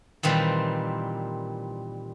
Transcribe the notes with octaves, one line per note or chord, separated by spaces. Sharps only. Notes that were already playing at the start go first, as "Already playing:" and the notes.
A#2 D#3 E3 G3 C4